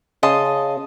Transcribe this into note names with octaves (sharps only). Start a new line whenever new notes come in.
C#3 D#5 A5 C6